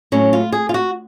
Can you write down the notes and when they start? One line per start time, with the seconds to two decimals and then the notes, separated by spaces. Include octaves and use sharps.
0.12 A2 F#3 C#4
0.33 F4
0.52 G#4
0.69 F4
0.74 F#4